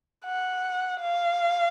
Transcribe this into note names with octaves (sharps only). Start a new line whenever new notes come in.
F#5
F5